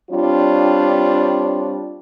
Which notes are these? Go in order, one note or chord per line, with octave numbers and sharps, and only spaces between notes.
G3 C4 D4 F4 C#5 D5